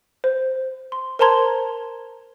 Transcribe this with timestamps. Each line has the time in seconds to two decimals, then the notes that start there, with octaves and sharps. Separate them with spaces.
0.24 C5
0.92 C6
1.19 A#4 C5 A5 A#5 C6 G#6